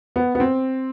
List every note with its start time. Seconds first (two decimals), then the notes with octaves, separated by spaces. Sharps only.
0.16 B3
0.35 B3
0.40 C4